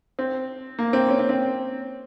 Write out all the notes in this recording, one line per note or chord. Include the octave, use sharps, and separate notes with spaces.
C4
A#3
C4
C#4
C4
C4